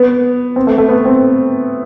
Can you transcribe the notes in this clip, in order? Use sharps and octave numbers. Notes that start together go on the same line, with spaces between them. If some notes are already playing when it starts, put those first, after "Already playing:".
Already playing: B3
C4
A3
A3
B3
C4